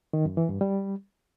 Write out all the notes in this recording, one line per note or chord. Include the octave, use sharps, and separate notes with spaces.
D#3
F#2
E3
G2
G3